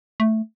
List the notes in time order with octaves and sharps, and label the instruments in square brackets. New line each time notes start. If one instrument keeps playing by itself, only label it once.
[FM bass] A3